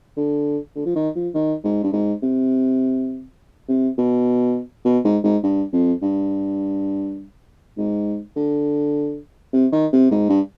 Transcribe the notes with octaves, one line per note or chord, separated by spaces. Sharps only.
D3
D3
F3
D#3
F3
D#3
G#2
G2
G#2
C3
C3
B2
B2
G#2
G#2
G2
F2
G2
G#2
D3
C3
D#3
C3
G#2
G2